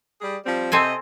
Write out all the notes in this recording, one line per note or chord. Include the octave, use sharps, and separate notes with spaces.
G3 G#4 D5
F3 G3 C4
C3 C4 A4 C5 D#5 G#5